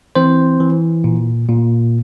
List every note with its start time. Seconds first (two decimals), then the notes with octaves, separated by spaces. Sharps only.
0.15 E3 C4 C5
0.60 E3
1.04 A#2
1.49 A#2